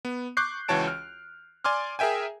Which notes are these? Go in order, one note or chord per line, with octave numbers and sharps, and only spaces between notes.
B3
C#6 D6 F#6 G6 C7
C#2 E3 F#4 C#5 A5 D7
F6
D5 G#5 C6 D6 F6
G#4 A#4 E5 G5 G#5